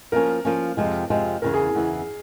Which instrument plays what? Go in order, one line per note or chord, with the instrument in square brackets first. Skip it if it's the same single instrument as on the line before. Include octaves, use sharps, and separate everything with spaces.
[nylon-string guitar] F3 A#3 C#4 [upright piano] A#4
[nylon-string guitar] F3 A#3 C#4
F2 C3 F3 G#3
F2 C3 F3 G#3
[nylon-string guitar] E2 C#3 E3 [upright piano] A#4
[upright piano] G#4
[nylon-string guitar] E2 C#3 E3